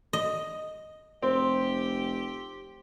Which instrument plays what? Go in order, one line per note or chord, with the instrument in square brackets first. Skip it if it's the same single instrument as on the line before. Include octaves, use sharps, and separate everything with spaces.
[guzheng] D#5
[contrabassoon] F1 [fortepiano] C4 [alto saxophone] G4